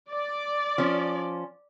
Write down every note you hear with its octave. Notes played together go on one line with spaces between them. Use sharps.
D5
F3 C#4